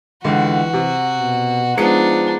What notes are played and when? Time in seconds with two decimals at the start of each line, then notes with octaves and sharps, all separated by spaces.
0.24 C#2 D3 E3 F#4
0.73 C3
1.18 B2
1.77 F3 G#3 B3 D4 D#4 C#7